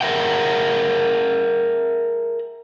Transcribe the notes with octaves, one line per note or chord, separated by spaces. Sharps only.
G#4 A#4 B4 E5 F#5 G5